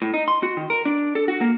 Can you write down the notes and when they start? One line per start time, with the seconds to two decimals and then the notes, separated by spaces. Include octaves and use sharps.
0.02 A2
0.14 D#4
0.28 C6
0.43 F#4
0.57 D#3
0.70 A#4
0.85 D4
1.15 A4
1.28 F#4
1.41 A#3